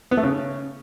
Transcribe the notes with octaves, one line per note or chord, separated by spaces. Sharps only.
B3
A3
C#3